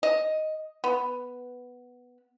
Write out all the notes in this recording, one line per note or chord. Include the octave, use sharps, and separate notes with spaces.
D#5
B3